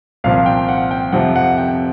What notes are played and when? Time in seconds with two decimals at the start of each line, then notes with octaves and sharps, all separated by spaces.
0.24 C2 A#2 F3 F5
0.46 G5
0.69 F#5
0.91 G5
1.12 F2 C3 F3 F#5
1.36 F#5
1.58 G5